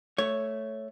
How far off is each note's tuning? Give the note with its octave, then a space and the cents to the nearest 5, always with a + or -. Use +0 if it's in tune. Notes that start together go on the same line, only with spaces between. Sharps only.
A3 +0 C#5 +0